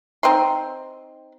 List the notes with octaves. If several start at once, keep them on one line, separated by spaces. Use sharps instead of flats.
C4 D#4 C6